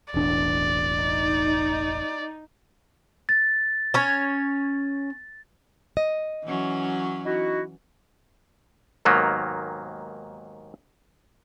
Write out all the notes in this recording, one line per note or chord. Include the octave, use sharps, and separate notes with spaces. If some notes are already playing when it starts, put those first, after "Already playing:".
E1 A1 D4 D5
D#4
A6
C#4 C#5
D#5
E3 F#3 C#4
D#4 E4 F#4
D#2 G#2 D#3 F#3 A#3 B3